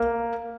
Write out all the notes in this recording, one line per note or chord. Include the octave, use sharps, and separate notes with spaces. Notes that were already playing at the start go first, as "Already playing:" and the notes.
Already playing: A#3